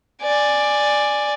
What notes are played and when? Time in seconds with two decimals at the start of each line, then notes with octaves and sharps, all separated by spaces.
0.22 D5 G#5